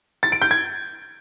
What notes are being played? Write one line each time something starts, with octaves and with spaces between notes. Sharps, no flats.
A6
D7
G6
G#6